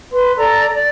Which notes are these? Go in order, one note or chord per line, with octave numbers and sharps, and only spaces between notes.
B4 C6
A4 D5 A#5
D5